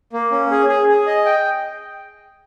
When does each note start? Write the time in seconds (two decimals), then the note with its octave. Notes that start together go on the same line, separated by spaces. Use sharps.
0.13 A#3
0.31 C#4
0.51 G#4
0.69 G#4
0.88 G#4
1.07 D#5
1.25 G5